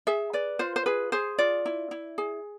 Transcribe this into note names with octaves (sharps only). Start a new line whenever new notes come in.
G#4 E5
B4 D5
F4 C5
C5
G#4 B4
G#4 C5
F4 D5
E4
E4
G#4